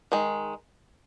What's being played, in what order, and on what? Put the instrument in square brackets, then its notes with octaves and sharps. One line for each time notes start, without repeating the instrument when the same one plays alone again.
[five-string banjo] D#3 G#3